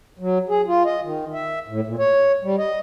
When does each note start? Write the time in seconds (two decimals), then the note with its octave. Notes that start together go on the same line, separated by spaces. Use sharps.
0.19 F#3
0.49 G#4
0.67 F4
0.85 D#5
1.03 D#3
1.33 E5
1.68 A2
1.87 A#2
1.99 C#5
2.43 G3
2.58 D#5